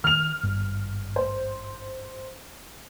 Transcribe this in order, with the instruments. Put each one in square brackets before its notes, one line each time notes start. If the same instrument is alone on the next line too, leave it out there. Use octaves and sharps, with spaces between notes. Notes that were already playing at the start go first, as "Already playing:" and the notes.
[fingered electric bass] D#3 [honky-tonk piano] F6 F7
[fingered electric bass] G#1 G2 G3
[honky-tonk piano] C5